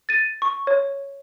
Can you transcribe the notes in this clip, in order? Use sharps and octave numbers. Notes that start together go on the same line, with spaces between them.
A6 D#7
C#6
C#5